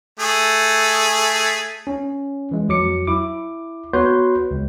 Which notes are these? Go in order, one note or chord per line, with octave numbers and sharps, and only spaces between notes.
A3 G#4
C#4
E3 G#3
F2 F#3 D6 C#7
E4 D6
B3 F#4 B4 C#5 C6 G6
C#2